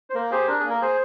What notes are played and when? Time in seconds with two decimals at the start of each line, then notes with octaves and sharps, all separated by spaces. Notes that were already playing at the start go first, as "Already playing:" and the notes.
0.10 C5
0.14 A#3 A#4
0.31 G4 G#4 C5
0.48 D4 A#4
0.59 G#4
0.65 A#3
0.70 A#4
0.81 G#4 C5